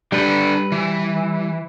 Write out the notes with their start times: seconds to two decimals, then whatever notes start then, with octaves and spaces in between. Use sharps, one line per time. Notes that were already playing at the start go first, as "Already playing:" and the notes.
0.12 G3 D4 G4 A4 B4 G6
0.72 E3